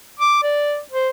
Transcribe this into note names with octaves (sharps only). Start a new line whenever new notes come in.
D6
D5
C5